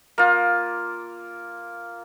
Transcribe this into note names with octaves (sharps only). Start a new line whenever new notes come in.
A#3 F4